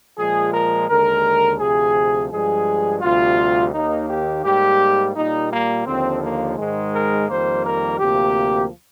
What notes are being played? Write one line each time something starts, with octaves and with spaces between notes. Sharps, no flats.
A#2 F3 G#3 G#4
A#4
D#2 D3 G#3 A#4
D2 C3 F3 G#4
G2 F3 G#3 G#4
D2 C3 G3 F4
D#2 D#3 A#3 D#4
G4
G#2 G3 A#3 G4
A#2 G3 A#3 D#4
A#3
D#2 D3 F3 C4
A#3
G#2 D#3 G#3
A#4
F2 D#3 G3 A#3 C5
A#4
D2 C3 F3 A#3 G4